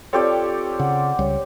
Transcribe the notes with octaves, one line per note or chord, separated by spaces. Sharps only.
C4 F4 G4 A4 C#5 D5
C#3 F#5
C#2 G3 C#5